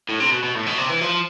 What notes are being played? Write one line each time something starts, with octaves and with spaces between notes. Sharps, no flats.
A2
C3
B2
B2
A2
B2
C3
E3
F3